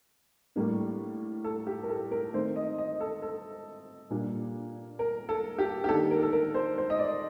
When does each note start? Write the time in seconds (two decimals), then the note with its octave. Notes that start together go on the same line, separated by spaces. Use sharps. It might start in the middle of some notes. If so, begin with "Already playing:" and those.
0.56 A2 G3 A#3 D4
1.44 A4
1.67 G4
1.83 A#4
1.89 A4
2.11 A#4
2.34 D#3 A3 C4 C5
2.56 D#5
2.78 D#5
3.00 A4
3.22 A4
4.10 A#2 G3 A#3 D4
4.99 A#4
5.29 A4
5.58 G4
5.84 G4
5.88 D#3 A#3 D4 A4
6.11 A#4
6.23 A4
6.33 A#4
6.54 C5
6.78 C5
6.90 D#5
6.99 D5